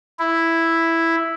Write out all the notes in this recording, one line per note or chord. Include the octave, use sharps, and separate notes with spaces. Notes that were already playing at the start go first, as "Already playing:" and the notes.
E4